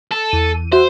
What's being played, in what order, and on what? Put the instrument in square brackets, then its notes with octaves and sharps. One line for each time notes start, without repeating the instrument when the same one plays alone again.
[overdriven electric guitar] A4
[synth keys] E2 D#7
[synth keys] F#4 E5 [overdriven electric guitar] C5